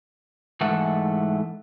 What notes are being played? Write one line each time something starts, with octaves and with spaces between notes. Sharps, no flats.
G#2 E3 A3 A4 F#5